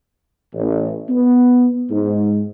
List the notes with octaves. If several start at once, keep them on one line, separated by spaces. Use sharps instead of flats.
A1
B3
G#2